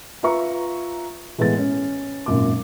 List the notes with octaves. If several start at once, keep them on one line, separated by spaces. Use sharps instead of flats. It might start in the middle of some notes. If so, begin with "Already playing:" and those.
F4 B4 E5 A#5 C#6
A2 E3 G#3 B3 G#4 A6
C#4
G#1 F#2 A#2 D6